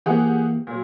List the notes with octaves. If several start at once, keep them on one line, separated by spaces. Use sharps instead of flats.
E3 A#3 G4 G#4 F#5
A#2 F#3